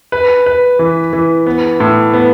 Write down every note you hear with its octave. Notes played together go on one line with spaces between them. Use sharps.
B4
B4
E3
E3
B3
A2
B3